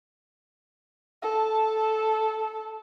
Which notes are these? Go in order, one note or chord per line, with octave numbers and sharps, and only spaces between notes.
A4 A5